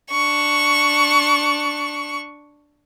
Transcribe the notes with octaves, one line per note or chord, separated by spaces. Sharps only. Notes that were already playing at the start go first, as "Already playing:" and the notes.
D4 C#6